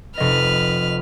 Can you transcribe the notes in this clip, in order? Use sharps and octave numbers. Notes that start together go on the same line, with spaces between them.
F1 B4 D#5 F6